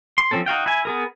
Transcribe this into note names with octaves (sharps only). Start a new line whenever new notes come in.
C6
F3 G3 C4 C#4 A4
D#4 F#4 F5 G5
E4 G#5
B3 G#4 A#4